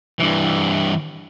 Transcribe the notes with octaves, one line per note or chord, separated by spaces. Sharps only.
G2 E3